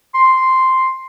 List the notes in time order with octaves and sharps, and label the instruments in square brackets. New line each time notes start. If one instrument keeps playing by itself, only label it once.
[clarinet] C6